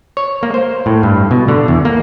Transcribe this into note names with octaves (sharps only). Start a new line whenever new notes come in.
C#5
A#3
C5
A2
G2
B2
D3
E2
A#3